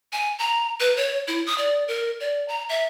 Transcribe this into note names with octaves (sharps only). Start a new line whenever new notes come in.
G#5
A#5
B4
C#5
E4
D#6
D5
A#4
D5
A#5
E5